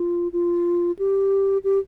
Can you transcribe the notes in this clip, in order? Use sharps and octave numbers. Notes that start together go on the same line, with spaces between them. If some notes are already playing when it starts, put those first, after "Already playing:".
Already playing: F4
F4
G4
G4